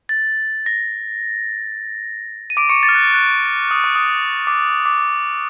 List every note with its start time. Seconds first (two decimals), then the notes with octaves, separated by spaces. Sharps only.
0.09 A6
0.66 A#6
2.50 D#7
2.57 D6 D7
2.69 C#6 C#7
2.83 A6
2.89 F6
2.95 F#6
3.14 F#6
3.71 D#6
3.84 D6
3.96 D#6
4.47 D6
4.86 D6